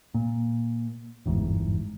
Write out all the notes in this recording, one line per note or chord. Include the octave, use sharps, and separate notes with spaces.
A#2
G1 E2 G#2